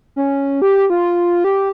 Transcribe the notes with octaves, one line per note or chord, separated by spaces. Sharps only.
C#4
G4
F4
G4